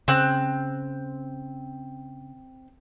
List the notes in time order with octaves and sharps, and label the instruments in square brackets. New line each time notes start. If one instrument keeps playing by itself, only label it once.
[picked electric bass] C#3 [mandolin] C4 F#6